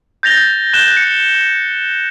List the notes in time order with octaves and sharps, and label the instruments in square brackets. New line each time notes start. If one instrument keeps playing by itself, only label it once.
[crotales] G6 A6 A#6 F7 G7
F#6 G6 E7 G7
C#7